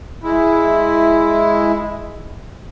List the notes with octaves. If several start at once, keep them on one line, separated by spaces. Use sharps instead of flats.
G#3 E4